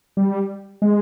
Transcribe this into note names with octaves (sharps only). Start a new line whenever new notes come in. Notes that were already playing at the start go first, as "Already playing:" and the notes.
G3
G#3